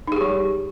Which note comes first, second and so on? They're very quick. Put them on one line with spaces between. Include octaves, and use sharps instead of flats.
D#4 G#4 G4 G3